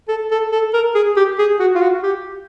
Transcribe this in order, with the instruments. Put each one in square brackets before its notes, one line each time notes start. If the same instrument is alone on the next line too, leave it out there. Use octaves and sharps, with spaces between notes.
[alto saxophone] A4
A4
A4
A#4
G#4
G4
G#4
F#4
F4
F#4
G4